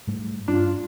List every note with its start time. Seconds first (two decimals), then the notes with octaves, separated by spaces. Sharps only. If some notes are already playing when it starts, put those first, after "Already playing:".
0.07 G#2 G3 A3
0.48 G2 D4 F4